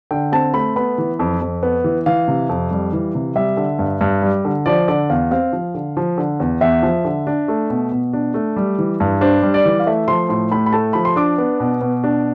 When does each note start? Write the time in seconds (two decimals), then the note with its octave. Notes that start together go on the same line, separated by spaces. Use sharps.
0.11 D3 G5
0.32 C4 A5
0.54 A3 B5
0.76 B3 B5
0.98 E3
1.19 F2
1.41 F2
1.63 B3
1.84 E3
2.06 E3 F5
2.28 C3
2.49 F2
2.71 G3
2.93 E3
3.15 C3
3.35 G3 E5
3.57 D3
3.79 G2
4.01 G2
4.22 G3
4.45 D3
4.66 F3 D5
4.88 D3 D5
5.09 E2 F5
5.31 C4 F5
5.53 F3
5.74 D3
5.97 F3
6.18 D3
6.40 E2
6.61 E2 E5
6.83 F3
7.05 D3
7.27 D4
7.48 A3
7.70 B2
7.92 B2
8.13 D4
8.34 A3
8.56 G3
8.78 E3
9.00 G2
9.21 D4 C5
9.42 G3
9.54 D5
9.65 E3
9.80 F5
9.86 A3 E5
10.08 F3 C6
10.29 A2 C6
10.52 A2 B5
10.66 B5
10.73 A3 A5
10.93 F3 B5
11.05 C6
11.16 D4 D6
11.38 B3
11.60 B2
11.81 B2
12.04 D4